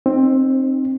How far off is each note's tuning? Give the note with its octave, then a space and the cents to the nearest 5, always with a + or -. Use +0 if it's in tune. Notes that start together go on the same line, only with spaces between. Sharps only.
C4 +15 D#4 -20